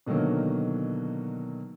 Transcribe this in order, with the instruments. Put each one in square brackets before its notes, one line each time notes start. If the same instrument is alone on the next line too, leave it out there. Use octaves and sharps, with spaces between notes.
[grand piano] B2 D3 D#3 F#3 A#3